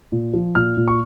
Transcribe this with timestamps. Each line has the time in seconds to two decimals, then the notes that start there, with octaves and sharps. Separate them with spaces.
0.12 A#2
0.34 F3
0.55 A#2 F6
0.77 A#2
0.88 C#6